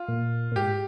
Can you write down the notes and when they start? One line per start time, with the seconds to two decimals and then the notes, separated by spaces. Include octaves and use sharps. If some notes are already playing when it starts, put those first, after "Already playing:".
Already playing: F4
0.08 A#2
0.52 A#2
0.55 G#2 G4